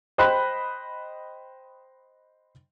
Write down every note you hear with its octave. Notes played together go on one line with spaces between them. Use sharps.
C5 D#5 G5 B5 F#6